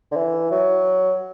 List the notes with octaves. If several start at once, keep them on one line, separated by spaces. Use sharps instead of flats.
D3
E3
F#3